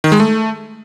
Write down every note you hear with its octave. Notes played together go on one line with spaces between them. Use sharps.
D#3
G#3
A3